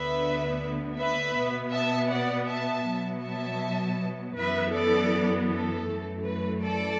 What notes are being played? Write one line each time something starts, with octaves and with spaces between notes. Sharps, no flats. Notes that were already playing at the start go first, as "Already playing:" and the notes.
Already playing: D2 D3 B3 B4 E5
B4 E5
B2 B3
E5 A5
D5 F#5
E5 A5
B2 F#3 B3
E5 A5
F#2 E3 B3 B4 E5
A4 D5
A4
F#2 E3 A3
B4
A4 D5